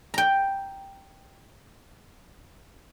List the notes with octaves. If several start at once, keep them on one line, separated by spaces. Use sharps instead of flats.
G5 A#5